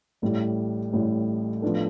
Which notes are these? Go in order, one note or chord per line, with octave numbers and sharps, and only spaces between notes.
A1 A2 G3
A1 A2 G3
A2 F3 B3 D4 A4